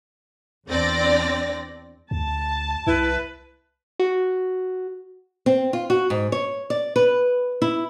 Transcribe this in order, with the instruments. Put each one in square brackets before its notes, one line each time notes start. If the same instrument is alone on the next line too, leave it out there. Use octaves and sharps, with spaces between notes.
[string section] E2 C4 D4 D5 A#6
[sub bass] D2 [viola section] A5
[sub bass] C2 [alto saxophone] E4 [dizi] B4
[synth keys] F#4
[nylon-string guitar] C4
F4
F#4
G#2
C#5
D5
B4
E4